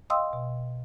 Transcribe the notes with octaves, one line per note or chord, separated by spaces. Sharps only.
D#5 F5 G5 C6 D#6 E6
B2